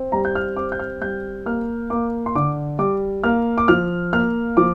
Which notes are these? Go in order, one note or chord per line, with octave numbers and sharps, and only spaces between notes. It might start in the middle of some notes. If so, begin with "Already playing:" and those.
Already playing: C4
G3 A#5
G6
F6
C4 D6
G6
F6
G3 G6
A#3 F6
A#3 D6
C6
D3 D6
G3 D6
A#3 F6
D6
F3 F6
A#3 F6
F3 D6